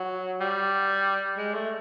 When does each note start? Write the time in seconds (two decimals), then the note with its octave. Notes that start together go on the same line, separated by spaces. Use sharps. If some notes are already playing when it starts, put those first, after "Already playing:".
Already playing: F#3
0.40 G3
1.38 G#3
1.54 A3